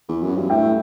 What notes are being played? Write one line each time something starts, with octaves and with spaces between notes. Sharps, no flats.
E2
F#2
G2
A2 E5 G5